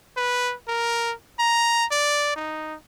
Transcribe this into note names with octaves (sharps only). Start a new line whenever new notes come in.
B4
A#4
A#5
D5
D#4